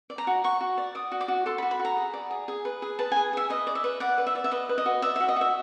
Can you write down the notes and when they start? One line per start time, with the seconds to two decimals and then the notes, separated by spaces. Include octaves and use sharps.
0.10 D5
0.18 A#5
0.27 F#4
0.44 F#4 C#6
0.61 F#4
0.78 D5
0.95 D5 D#6
1.12 F#4
1.21 D6
1.28 F#4
1.46 A4 C6
1.58 B5
1.63 F#4
1.71 B5
1.79 F#4
1.85 A#5
1.97 G#4
2.14 D5
2.31 G#4
2.48 G#4
2.65 B4
2.82 G#4
2.99 B4 A5
3.12 G#4 G#5
3.33 G#4 E5
3.50 B4 D#5
3.67 D5
3.75 E5
3.84 B4
4.00 D5 F#5
4.18 B4
4.27 E5
4.35 D5
4.44 E5
4.51 B4 D#5
4.69 B4
4.78 D#5
4.86 F#4
5.02 D5 E5
5.16 F#4 E5
5.29 D#5
5.36 F#4 E5